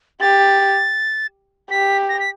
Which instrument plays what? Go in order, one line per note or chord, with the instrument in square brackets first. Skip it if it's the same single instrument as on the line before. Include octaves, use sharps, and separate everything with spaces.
[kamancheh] G4 [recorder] A6
[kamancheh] G4 [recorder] B6
[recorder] A#6
B6